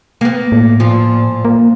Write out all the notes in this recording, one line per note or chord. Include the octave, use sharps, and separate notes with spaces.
A#3 B3
A2
A#2 F3 F4
A#3